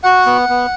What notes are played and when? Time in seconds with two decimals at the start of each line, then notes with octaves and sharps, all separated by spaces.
0.03 F#4 F#5
0.26 B3
0.49 B3